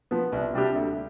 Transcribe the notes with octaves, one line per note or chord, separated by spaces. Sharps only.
F3 B3
C2
C3 G3 D4 G4
D2